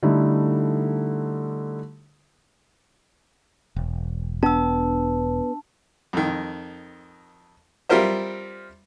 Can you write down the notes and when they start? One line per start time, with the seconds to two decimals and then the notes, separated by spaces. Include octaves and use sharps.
0.03 D3 G3 A3 D#4 E4
3.76 E1
4.43 B3 D4 A5 E6
6.13 F2 D#3
7.89 G3 C4 F4 A#4 C5 E5